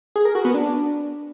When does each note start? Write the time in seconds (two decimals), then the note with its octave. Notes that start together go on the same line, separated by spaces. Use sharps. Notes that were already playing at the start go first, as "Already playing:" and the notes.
0.16 G#4
0.25 A#4
0.35 F#4
0.45 B3
0.54 D4